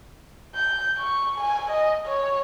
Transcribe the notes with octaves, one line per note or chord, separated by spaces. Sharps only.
G6
C#6
G#5
D#5
C#5